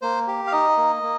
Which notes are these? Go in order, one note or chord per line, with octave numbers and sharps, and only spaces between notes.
A#3 C5
G4
F5
D#4 D#5
A#3
A#3